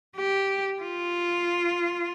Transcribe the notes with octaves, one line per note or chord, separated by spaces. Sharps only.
G4
F4